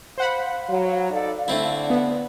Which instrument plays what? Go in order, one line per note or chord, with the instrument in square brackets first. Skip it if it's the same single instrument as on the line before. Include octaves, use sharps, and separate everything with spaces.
[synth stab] C5 F#5 B5 [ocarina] F5
[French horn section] F#3
D#4 A4 D5
[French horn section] D3 [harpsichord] A3 C4 E4
[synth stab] B3